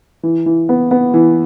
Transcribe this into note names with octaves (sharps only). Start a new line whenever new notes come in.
E3
E3
B3
B3
E3